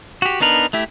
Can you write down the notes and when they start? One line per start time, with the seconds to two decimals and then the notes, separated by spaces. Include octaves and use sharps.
0.22 F#4 G4
0.40 B3 D4 D#4 A#4 B4
0.73 A3 E4 G4